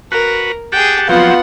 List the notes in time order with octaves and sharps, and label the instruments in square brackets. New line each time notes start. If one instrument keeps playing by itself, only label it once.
[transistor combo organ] F#4 B4 [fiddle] A#4
[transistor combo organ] G4 F#5 A5 [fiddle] G#4 G5
[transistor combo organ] F3 F#3 C4 [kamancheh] B3 F4 [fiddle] F#5